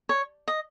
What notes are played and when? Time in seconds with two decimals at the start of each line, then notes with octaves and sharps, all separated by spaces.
0.09 C#5
0.48 D#5